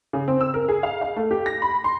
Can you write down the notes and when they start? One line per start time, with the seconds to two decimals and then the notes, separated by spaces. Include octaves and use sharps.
0.13 C#3
0.28 C4
0.41 E6
0.54 A#4
0.68 G#4
0.83 F5
1.01 F5
1.16 A3
1.31 G4
1.46 A#6
1.62 B5
1.84 C6